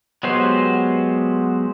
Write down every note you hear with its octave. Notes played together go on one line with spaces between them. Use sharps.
F#3 G#3 B3 G4 C5